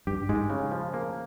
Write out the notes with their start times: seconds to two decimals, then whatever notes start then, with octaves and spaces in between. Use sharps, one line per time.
0.07 G2 G4
0.29 G#2 G#3
0.50 C#3
0.71 F3
0.94 A#3